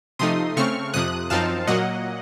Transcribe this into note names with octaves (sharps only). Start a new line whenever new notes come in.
C3 F3 A3 D#4 C6 D#6
C#3 A3 C4 C#6 F6
F2 C3 F3 D#6 F#6
F#2 F3 C4 D#4 F5 A5
A#2 F#3 A#3 D#5 F#5